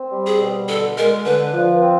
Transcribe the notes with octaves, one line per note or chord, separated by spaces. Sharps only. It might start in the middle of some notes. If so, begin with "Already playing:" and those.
Already playing: C4
G3
G#4
B2
D3 A4
G#3 A#4
D3 B4
F3
C4